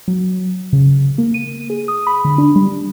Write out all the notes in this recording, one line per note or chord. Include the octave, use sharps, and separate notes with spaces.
F#3
C#3
A#3
D#7
G#4
D#6
B5
D3
D4
G3